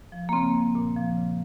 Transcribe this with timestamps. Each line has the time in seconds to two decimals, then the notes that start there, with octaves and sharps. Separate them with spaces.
0.12 F3
0.29 A#3
0.33 C#3 C4
0.54 F3
0.75 A#2
0.96 F3
1.17 C#3